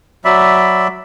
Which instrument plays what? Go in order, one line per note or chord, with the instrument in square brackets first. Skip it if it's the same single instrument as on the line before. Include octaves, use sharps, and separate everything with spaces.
[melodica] F#3 D5 E5 B5